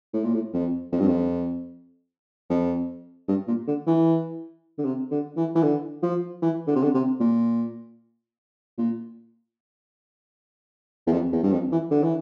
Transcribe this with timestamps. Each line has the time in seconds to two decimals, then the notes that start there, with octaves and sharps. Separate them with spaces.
0.14 A2
0.24 A#2
0.34 A2
0.54 F2
0.92 F2
1.00 G2
1.08 F2
2.50 F2
3.28 G2
3.48 A#2
3.67 D3
3.87 E3
4.79 D3
4.85 C3
5.12 D3
5.37 E3
5.55 E3
5.63 D3
6.03 F3
6.42 E3
6.68 D3
6.76 C3
6.84 D3
6.94 C3
7.20 A#2
8.78 A#2
11.07 E2
11.13 F2
11.33 E2
11.43 G2
11.52 F2
11.72 E3
11.91 D3
12.03 E3